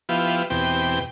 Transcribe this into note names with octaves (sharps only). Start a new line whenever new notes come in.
F3 B3 E4 F4 G4
E2 B2 C4 G4 G5